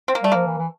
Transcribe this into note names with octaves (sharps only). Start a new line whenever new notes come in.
C4
A#3
G3 A3
F3 A#3
E3
E3